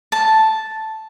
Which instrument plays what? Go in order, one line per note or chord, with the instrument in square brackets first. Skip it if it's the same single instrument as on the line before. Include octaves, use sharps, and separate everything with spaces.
[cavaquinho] A5